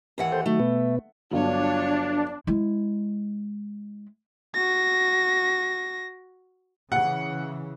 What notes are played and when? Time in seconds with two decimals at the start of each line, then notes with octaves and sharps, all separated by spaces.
0.18 D#2 E3 F#5
0.32 A4 C5 G5
0.46 D#3 F#3 A3
0.60 B2 B3
1.31 G1 F#3 D4 F4 C#5
2.47 G#3 E4
4.54 F#4 A#6
6.92 C#3 E3 F#5